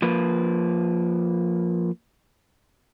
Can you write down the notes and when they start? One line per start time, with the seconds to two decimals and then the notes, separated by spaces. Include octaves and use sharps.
0.02 F3 A#3 B4